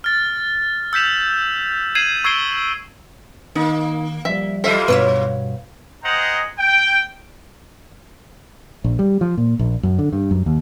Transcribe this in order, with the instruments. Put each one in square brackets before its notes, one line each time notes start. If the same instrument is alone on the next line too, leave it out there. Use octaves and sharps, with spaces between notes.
[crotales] F6 A6
E6 G6 B6 E7 F7
G#6 C7 D#7 E7 F#7
C#6 E6 G#6 C7 D7 G7
[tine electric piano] D#3 [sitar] A#3 [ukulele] D#4
[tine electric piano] F3 G3 [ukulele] E5
[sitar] F#3 F4 C5 [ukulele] A4 E5
[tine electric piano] G2 B2 G3 [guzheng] B3 C#5 E5 [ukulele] B4 F5
[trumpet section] G#4 C5 D#5 F#5 G5 A#5
G5
[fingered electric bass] A#1
G3
F3
A#2
A#1
F#2
D3
G2
F#2
D#2